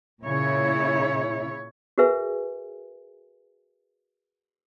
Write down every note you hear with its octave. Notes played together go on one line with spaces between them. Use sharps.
A#2 C#3 E4 C#5
F#4 G#4 A#4 B4 E5 G#5